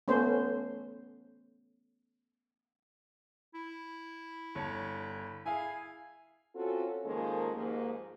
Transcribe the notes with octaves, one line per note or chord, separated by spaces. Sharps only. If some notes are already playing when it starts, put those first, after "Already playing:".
A3 B3 C#4 C5
E4
G1 C#5 A5
E4 G#4 F5 G#5
C4 C#4 F4 F#4 A4
D#3 F3 G#3 A#3 C#4 A4
D#2 G#2 F3 A#3